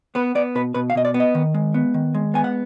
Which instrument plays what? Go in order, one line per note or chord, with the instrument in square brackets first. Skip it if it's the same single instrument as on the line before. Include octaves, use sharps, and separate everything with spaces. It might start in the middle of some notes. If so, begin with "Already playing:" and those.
[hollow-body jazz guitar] B3 B4
B3 D5
B2 B4
B2 B4
F5
B2 D#5
D5
B3
D#5
D#3
G#3
B3
D#3
G#3
B3 G#5
F#5